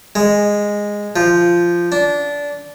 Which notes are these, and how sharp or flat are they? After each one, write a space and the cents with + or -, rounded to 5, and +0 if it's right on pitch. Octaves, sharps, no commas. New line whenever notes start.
G#3 -10
F3 -10
D4 -20